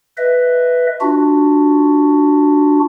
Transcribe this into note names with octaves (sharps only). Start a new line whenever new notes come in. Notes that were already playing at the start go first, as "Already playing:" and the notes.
B4 D#5 E5
D4 F4 F#4